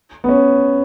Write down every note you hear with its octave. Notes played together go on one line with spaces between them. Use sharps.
B3
C#4